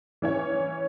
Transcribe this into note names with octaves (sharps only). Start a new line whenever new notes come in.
E3 C#4 C#5